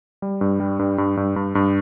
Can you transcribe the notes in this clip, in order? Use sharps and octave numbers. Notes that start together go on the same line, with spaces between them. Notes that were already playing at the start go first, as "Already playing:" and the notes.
G3
G2
G3
G2
G2
G2
G2
G2